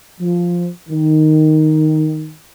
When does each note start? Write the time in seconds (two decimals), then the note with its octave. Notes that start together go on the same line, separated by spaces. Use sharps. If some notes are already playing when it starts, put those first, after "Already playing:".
0.20 F3
0.89 D#3